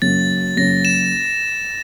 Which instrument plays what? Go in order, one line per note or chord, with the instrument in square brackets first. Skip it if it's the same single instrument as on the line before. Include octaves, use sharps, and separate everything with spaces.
[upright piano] F#2 C#3 F#3 A#3 C#4 [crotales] A6
[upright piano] F#2 C#3 F#3 A#3 C#4 [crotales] A#6
[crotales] E7